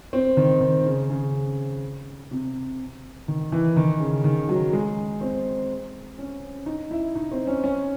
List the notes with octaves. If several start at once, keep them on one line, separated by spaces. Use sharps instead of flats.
C4
D#3
D#3
C#3
C#3
C3
D#3
E3
D#3
C#3
D#3
F#3
G#3
C4
C#4
D#4
E4
D#4
C4
C#4
C#4